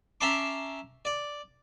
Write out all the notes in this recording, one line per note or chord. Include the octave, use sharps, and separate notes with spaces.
C#4 E5 A5 A#5 C6 D6
D5